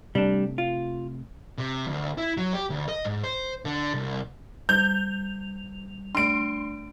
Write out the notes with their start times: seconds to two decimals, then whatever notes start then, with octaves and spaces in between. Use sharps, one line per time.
0.15 C3 G3 A3 D4
0.58 F4
1.58 C3
1.87 D2
2.18 E4
2.37 F#3
2.54 G4
2.70 D2
2.89 D#5
3.05 G#2
3.24 C5
3.65 D3
3.94 C2
4.69 G3 G6 F7
6.15 A3 D4 C6 D7